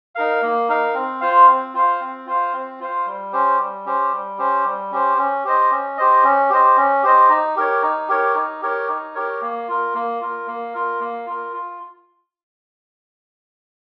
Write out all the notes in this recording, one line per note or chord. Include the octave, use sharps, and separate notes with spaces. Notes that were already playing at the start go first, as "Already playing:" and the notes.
D#4 A#4 F5
A#3
D#4 A#4 F5
C4
F4 C5 F5
C4
F4 C5 F5
C4
F4 C5 F5
C4
F4 C5 F5
G3
C#4 G4 C5
G3
C#4 G4 C5
G3
C#4 G4 C5
G3
C#4 G4 C5
C#4
G4 C5 D#5
C#4
G4 C5 D#5
C#4
G4 C5 D#5
C#4
G4 C5 D#5
D#4
G4 A#4 C#5
D#4
G4 A#4 C#5
D#4
G4 A#4 C#5
D#4
G4 A#4 C#5
A#3
F4 A#4
A#3
F4 A#4
A#3
F4 A#4
A#3
F4 A#4
F4